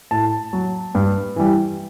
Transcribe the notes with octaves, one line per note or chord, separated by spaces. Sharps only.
A2 A5
F#3
G2
E3 G3